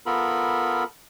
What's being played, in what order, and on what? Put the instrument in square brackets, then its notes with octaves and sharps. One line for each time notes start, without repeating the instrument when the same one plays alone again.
[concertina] B3 F4 A4 A#4 B5